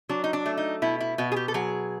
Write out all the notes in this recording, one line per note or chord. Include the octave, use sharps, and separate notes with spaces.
F#3 D4
D#4
D4
A3
D#4
B2 E4
E4
B2 F#4
G#4
G4
A4
F#3 G#4